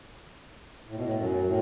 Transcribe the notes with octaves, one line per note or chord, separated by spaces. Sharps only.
A2
B2
A2
F#2
A2